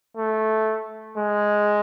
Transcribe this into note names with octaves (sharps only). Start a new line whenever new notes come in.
A3
G#3